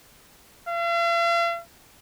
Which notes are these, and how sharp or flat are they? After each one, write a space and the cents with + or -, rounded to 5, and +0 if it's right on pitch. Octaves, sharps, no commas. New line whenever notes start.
F5 -45